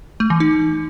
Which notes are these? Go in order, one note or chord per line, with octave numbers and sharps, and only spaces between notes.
A3
E3
D#4